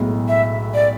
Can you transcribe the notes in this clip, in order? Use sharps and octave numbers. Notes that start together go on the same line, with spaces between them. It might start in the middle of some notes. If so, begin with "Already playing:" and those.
Already playing: B1 A2 G#3
E5
D5